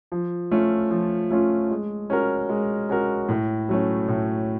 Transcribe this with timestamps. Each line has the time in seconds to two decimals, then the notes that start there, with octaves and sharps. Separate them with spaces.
0.12 F3
0.51 A3 C#4 F4
0.91 F3
1.31 A3 C#4 F4
1.71 G#3
2.10 C#4 F#4 A#4
2.49 G#3
2.89 C#4 F#4 A#4
3.29 A2
3.69 F#3 A3 C#4
4.08 A2